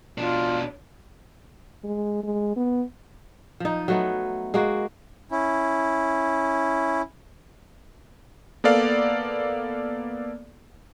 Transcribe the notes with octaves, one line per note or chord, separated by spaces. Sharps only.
B2 D4 F4
G#3
G#3
B3
F3 D#4
F#3 A3 B3
G#3 A#3 F#4
C#4 E4
A#3 B3 A4 D5 F5